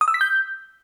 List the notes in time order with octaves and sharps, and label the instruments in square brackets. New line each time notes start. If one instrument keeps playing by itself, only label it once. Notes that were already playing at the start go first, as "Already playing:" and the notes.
[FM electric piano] D#6
E6
B6
G6